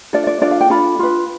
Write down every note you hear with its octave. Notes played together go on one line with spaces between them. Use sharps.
D4 F4 A4 D5
D5
D4 F4 A4 D5
F5
G5
D4 F4 A4 B5
F4 B4